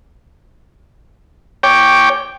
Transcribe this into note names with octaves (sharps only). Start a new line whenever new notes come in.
C#5 G5 D6